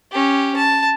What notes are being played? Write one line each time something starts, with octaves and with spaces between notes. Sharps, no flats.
C#4 G4
A5